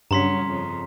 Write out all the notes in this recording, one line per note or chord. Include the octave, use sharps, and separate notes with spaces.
G2 C#3 F#3 C#4 A#5 C6 B6
F2 C#3